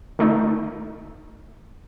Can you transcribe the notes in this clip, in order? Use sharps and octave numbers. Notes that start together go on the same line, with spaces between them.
D3 A3 D#4